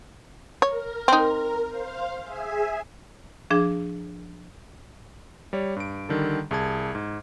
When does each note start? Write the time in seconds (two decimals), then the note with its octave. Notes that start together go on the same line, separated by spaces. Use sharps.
0.62 A#4 C#5
1.08 C4 D#4
1.68 C5 F5
2.21 G#4 E5 G#5
3.50 F3 D4 G#4
5.53 G3 C#5 D5
5.76 G2 D7
6.09 D3 D#3 G3 A4
6.51 C2 G#4 A5 G#6
6.95 G#2